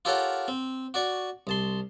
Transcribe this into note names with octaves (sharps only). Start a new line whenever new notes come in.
F4 G4 A4 A#4 C#5 F#5
C4
F#4 D5 C#6
C2 A5 C6